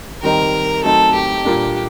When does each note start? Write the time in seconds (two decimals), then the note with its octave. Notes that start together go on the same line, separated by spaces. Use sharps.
0.22 D#3 G3 C4 D#4 A#4
0.84 F#3 A3 C4 D#4 A4
1.14 G4
1.44 A#2 G3 A#3 D4